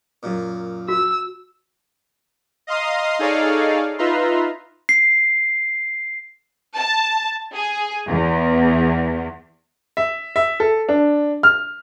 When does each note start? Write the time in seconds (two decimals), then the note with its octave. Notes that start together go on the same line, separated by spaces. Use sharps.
0.23 F#2 A#2
0.89 F#4 E6
2.67 D#5 F5 A#5 C6 D#6
3.19 D#4 G#4 A4 C#5 D5 F5
3.98 D#4 F4 B4 E5 A#5 C6
4.89 C7
6.77 A5
7.54 G#4
8.09 E2
9.97 E5
10.36 E5
10.60 A4
10.89 D4
11.43 F6